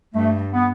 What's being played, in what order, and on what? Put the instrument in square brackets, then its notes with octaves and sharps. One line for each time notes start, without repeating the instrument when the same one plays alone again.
[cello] G2 [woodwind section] A3
[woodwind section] B3